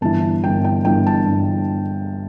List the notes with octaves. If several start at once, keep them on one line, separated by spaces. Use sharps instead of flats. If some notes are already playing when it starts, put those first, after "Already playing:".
G1 G2 E3 A5
G1 G2 E3 G5
G5
G1 G2 E3 G5
A5
G1 G2 E3